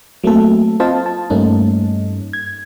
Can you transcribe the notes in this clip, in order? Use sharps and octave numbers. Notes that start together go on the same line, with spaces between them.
F#3 A3 A#3 C4 A4
C4 F4 C5 D#5 F5 A5
A5
G2 G3 A3 A#3 C#4 D#4
G#6